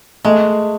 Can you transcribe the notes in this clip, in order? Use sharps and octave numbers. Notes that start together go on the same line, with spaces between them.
G#3 A3